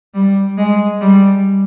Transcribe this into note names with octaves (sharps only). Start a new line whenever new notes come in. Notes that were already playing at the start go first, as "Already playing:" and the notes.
G3
G#3
G3